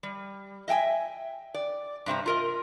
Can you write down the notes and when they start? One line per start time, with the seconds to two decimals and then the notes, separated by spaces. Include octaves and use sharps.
0.03 G3
0.68 D#5 E5 G5 G#5
1.54 D5
2.06 G2 C3 C4 A#5
2.26 F4 A#4 D#5